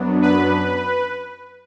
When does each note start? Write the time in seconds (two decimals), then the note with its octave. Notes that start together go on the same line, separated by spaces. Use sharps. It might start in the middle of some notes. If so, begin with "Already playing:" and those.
Already playing: F#2 F#3 B3 D4
0.22 B4